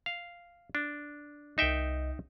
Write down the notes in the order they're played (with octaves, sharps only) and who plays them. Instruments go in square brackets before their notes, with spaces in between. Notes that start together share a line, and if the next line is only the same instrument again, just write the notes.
[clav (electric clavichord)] F5
D4
[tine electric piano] C2 D#5 [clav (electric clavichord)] D#4 E5 G5